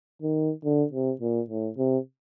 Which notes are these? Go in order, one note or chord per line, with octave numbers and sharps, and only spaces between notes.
D#3
D3
C3
A#2
A2
C3